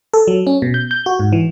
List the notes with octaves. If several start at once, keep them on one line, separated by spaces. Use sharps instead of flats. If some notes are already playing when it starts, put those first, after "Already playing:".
A4
F#3
C#4
B2
G6
G6
F#4
G#2
E3